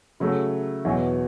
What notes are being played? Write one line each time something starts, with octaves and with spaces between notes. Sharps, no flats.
C#3 F#3 A3
E2 B2 F#3